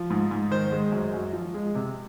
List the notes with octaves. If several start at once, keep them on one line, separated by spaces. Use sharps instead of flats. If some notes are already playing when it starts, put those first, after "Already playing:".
Already playing: F3
G#2
G#2
D#3 C5
G#3
F#2
F#2
F3
G#3
C3